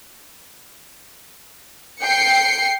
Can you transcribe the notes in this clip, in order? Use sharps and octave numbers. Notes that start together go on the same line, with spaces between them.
G5 C7 C#7